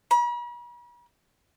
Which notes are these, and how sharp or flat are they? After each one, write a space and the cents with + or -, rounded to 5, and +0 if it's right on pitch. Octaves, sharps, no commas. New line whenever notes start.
B5 -45